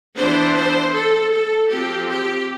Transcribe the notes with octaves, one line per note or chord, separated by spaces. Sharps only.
E3 B3 D4 C5
C5
A4
A4
F3 C4 G4
G4